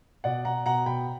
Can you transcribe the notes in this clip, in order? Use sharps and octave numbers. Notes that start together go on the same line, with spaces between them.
B2 D5 F#5
B2 F#5 A#5
B2 F#5 A#5
B2 G5 B5